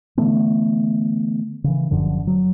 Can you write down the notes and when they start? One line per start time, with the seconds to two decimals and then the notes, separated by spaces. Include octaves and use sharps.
0.17 D3 E3 A3 B3
1.64 C#3 E3
1.91 F#1 F#2 D3 F3
2.27 F#3